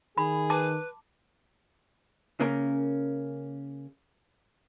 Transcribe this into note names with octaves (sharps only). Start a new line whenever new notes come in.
D#3 G#4 B5
B4 A5 D6
C#3 A#3 C#4 A#4